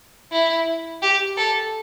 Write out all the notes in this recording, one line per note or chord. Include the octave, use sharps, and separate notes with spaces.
E4
G4
A4